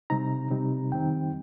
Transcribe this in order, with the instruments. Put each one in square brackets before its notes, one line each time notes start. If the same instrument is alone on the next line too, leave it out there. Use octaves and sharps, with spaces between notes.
[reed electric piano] C3 G3 C4 D#4 A#5
C3 G3 C4 D#4
F2 D#3 G3 C4 D#4 G5